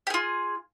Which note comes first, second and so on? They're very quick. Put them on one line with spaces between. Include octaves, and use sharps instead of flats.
G4 G#4 F4